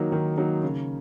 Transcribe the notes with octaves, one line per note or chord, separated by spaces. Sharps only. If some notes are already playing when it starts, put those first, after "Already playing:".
Already playing: D#3 F#3 A#3 D#4
D#3
F#3 A#3 D#4
C#3